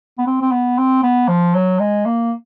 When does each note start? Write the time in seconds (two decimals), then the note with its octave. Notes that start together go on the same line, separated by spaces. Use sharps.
0.18 B3
0.27 C4
0.41 C4
0.51 B3
0.78 C4
1.03 B3
1.28 F3
1.54 F#3
1.80 G#3
2.06 A#3